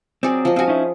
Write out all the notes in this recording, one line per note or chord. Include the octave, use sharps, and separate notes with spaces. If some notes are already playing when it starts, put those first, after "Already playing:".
F#3 C4 G#4 D5
F3 D#5
C4 F4 F#4 G#4
C#4 D#4 E4